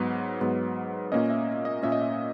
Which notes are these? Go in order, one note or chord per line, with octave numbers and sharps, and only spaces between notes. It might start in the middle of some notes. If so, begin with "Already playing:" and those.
Already playing: G#2 F#3 B3 B4
G#2 F#3 B3
A#2 A#3 C#4 D#5
E5
D#5
A#2 A#3 C#4 E5
D#5
E5